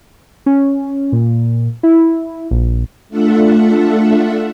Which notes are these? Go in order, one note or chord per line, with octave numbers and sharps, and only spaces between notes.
C#4
A#2
E4
A#1
A3 D4 F4 A4 E5 F#5